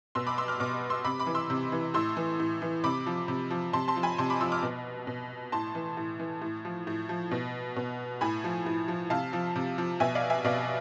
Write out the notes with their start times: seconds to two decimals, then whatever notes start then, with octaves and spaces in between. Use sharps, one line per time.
0.15 B2 C6 E6
0.27 B5 D6
0.38 C6 E6
0.48 D6 F6
0.60 B2 D6 F6
0.90 C6 E6
1.05 C3 B5 D6
1.19 B5 D6
1.27 E3
1.35 C6 E6
1.50 C3
1.72 E3
1.94 A2 C6 E6
2.17 E3
2.40 A2
2.62 E3
2.84 C3 B5 D6
3.06 F3
3.28 C3
3.50 F3
3.73 C3 A5 C6
3.88 A5 C6
3.96 F3
4.03 G#5 B5
4.18 C3 A5 C6
4.30 B5 D6
4.40 F3 C6 E6
4.52 D6 F6
4.62 B2
5.07 B2
5.52 A2 A5 C6
5.75 E3
5.97 A2
6.20 E3
6.42 A2
6.65 F3
6.87 A2
7.09 F3
7.31 B2
7.76 B2
8.21 A2 G#5 B5
8.44 F3
8.66 A2
8.88 F3
9.10 C3 F5 A5
9.33 F3
9.56 C3
9.78 F3
10.00 B2 E5 G#5
10.15 D5 F5
10.30 E5 G#5
10.44 B2 D5 F5